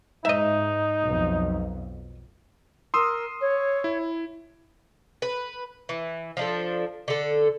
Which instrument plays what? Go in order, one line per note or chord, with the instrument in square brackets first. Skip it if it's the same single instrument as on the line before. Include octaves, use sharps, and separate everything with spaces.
[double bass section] G#2 [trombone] D#4 [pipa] D#5 E5
[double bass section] B1 F2
[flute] A#4 [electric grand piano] C6 D#6 E6
[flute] C#5
[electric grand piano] E4
[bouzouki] B4
E3
F3 D4 A4
D3 A4